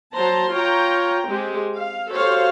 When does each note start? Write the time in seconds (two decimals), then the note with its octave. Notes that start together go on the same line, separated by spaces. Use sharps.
0.14 F#3 C5 A5 A#5 C6
0.52 F4 C#5 G5 A#5
1.28 G#3 C4 G4
1.77 F5
2.10 F#4 G4 A4 C5 C#5 F5